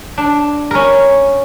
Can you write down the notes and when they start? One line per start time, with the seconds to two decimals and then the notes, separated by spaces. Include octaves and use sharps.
0.18 D4
0.71 C#4 A#4